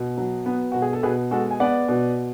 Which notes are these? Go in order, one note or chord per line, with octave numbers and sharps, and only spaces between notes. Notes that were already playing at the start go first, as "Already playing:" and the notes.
Already playing: B2
F#3
B3
B2 F#4
G#4
A4
B2 G#4 B4
G#3 F#4 A4
G#5
B3 D5 F#5
B2